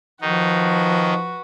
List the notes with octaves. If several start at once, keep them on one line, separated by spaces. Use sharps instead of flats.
D#3 F3 D#4 F#4 B4